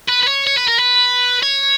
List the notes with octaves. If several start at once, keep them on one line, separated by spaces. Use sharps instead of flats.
B4
B4
C#5
C#5
B4
A#4
B4
C#5